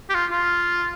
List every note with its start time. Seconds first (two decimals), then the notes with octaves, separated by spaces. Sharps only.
0.10 G4
0.14 F4
0.31 F4